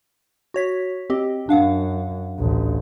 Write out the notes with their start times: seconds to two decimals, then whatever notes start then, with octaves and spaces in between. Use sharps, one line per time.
0.54 F#4 C#5 B6
1.10 C4 G4 D#5
1.49 F#2 D4 F5 F#5
2.39 A1 D2